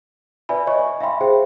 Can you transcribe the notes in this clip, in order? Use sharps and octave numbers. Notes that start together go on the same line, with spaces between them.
B4 D5 E5 G#5 B5
C#5 D#5 C#6
G#5
E5 F5 G5 B5 C6
G#4 C5 G5